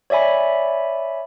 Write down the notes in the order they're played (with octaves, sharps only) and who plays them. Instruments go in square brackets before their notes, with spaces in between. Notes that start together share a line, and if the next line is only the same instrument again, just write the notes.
[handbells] C#5 D5 E5 G#5 B5